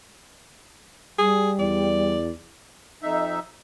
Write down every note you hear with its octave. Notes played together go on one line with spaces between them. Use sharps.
G3 G#4
E2 D5
F2 D#4 E5